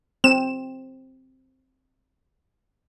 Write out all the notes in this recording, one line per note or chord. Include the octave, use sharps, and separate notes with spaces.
C4 E7